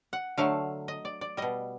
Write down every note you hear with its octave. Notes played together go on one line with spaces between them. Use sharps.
F#5
D3 F#3 A3 F5
D#5
D5
D5
B2 G3 D#5